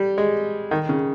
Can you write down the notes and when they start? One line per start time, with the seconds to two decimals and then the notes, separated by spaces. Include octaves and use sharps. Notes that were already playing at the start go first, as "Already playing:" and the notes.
Already playing: G3
0.18 G#3
0.71 D#3
0.89 C#3